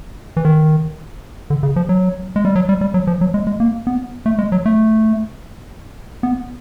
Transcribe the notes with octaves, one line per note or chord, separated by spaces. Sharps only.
E3
D#3
D3
C#3
F3
F#3
G#3
G3
F#3
G3
G3
F#3
F3
F#3
G#3
G#3
A#3
B3
A3
G#3
F#3
A3
B3